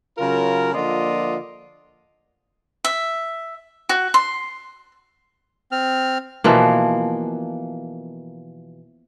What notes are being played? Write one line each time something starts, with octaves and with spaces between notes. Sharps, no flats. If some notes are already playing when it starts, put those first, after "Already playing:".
C#3 F#3 F4 A#4
D3 F3 A#3 F4 D5 D#5
E5
F#4
C6
C4 F6
B2 E3 F3 A#3